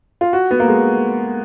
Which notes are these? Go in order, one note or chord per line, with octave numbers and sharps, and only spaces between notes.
F4
F#4
B3
A#3
G#3